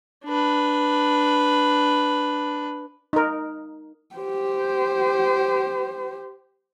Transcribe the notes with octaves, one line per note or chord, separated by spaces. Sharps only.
D4 B4
D#4 A#4
G4 C5